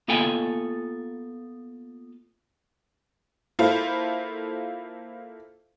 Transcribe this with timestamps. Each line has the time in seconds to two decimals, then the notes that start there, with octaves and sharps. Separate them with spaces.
0.08 A#3 B3 F4 A4 G5 G#5
3.59 A#3 E4 F4 A4 C5 F5